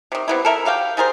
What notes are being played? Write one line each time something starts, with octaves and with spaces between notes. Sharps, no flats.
C3 D#3
C3 B3 E4
A4 A#4 E5
F#4 G4 F5 G5
G3 G#4 A#4 C5